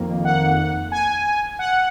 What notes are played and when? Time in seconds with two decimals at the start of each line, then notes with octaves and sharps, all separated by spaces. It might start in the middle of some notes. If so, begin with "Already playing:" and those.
Already playing: F2 D#3 A#3
0.25 F#5
0.92 G#5
1.59 F#5